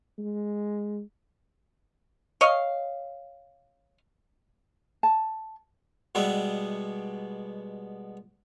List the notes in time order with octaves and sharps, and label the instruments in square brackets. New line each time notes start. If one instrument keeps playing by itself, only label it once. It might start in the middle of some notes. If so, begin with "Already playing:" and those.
[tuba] G#3
[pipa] C#5 D#5 F5
[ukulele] A5
[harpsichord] B2 G3 G#3 B3 E5